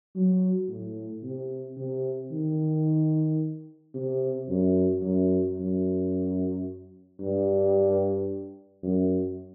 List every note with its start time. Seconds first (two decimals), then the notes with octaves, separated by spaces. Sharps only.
0.15 F#3
0.68 A2
1.23 C3
1.77 C3
2.32 D#3
3.94 C3
4.49 F#2
5.02 F#2
5.57 F#2
7.20 G2
8.83 F#2